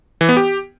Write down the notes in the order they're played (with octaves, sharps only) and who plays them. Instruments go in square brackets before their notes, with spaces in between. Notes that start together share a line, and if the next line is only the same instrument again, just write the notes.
[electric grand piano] E3
B3
G4